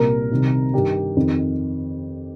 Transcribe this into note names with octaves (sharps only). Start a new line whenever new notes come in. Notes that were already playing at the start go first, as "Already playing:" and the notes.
Already playing: C2 A#2 A#4
C2 C3 D#3
G2 D#3 G4
F2 D#3